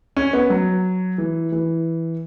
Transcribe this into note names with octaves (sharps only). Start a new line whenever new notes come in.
C#4
B3
F#3
E3
E3